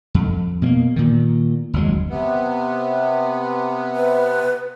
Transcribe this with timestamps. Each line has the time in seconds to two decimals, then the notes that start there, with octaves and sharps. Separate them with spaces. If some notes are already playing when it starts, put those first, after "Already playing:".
0.14 F2
0.62 B2 A3 A#3
0.96 A#2 D#3
1.74 F#1 D#2 F#3 G#3
2.10 C3 B3
3.96 B4